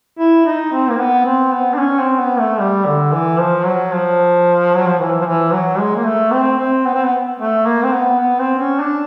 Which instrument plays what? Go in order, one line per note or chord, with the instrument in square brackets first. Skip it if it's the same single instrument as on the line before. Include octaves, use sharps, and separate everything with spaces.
[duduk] E4
D#4
C4
A#3
B3
C4
B3
D4
C#4
C4
B3
A3
G3
D3
E3
F3
F#3
F3
F#3
F3
E3
F3
E3
F#3
G#3
A#3
A3
C4
C4
B3
C4
B3
A3
A#3
C4
B3
B3
C4
C#4
D4